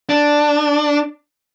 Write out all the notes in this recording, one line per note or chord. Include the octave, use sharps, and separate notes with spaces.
D4